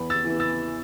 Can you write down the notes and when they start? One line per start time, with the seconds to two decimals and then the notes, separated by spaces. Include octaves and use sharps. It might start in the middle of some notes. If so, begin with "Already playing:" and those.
Already playing: E2 B5
0.10 E6 A6
0.25 E3 B3
0.40 E6 A6